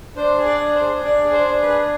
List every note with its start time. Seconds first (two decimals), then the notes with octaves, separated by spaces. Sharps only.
0.16 D4 C5
0.38 G#4
0.45 D5
0.60 D4
0.75 C5
0.82 G#4
1.03 D4 D5
1.25 G#4
1.33 C5
1.47 D4
1.62 B4
1.69 G#4